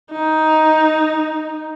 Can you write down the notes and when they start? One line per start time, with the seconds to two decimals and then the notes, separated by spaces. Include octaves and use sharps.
0.12 D#4